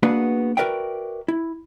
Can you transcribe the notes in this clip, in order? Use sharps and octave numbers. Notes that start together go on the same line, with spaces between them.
A#3 B3 D4 F#4 G#4 B4
F#4 A#4 B4 D5 E5 G5
E4